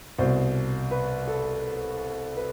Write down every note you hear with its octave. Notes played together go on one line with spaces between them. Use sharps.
C2 B2 C5
B4
A4
B4